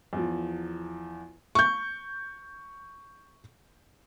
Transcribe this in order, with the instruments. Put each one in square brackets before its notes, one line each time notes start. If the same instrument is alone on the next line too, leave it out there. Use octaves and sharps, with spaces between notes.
[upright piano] E2 F3
[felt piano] C#6 G6